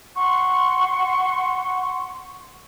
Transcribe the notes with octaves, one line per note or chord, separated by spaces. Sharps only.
F#5 C6 C#6